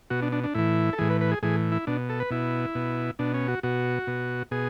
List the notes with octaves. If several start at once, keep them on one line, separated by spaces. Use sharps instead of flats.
B2 F#4
D4
D4
D4
A2 E3 E4
A4
A2 E3 G#4
B4
B4
G#4
A2 E3 G#4
E4
B2 D4
A4
B4
B2 E4
B2
B2 D4
C#4
F#4
B2 F#4
B2
B2 G#4